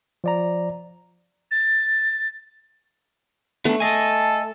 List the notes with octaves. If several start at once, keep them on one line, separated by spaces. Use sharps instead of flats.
F3 D5 A#5
A6
A3 B3 D4
A4 D#5 G#5